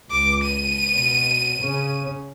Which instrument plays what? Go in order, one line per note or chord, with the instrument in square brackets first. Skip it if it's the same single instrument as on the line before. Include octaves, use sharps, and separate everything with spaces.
[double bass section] C#2 [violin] D6
[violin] D#7
[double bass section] B2
C#3 C#4